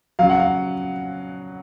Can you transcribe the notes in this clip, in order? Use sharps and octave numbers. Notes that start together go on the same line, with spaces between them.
C#3 F#3 F5
F#5
F5